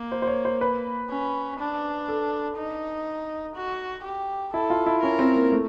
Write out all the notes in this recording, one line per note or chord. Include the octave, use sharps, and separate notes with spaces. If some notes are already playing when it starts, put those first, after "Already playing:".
Already playing: A#3
C5
C5
C#5
C5
B4
C#4
D4
A4
D#4
F#4
G4
E4 A4
F4
E4
C#4 A#4
C4
A#3
A3